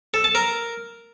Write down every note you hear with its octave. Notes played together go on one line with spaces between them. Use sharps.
A4
A5
A#4